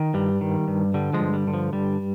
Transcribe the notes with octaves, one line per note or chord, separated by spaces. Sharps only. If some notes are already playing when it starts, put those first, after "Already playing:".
Already playing: D#3
G2 G3
D#3
G2
D3 G3
F3 G#3
G2
G3
D3
F3
G2 G3